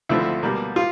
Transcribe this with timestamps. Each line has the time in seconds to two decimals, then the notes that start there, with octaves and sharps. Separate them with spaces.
0.09 D2 D3 F3 A3 C4 E4
0.43 B2 G3 A#3
0.76 F4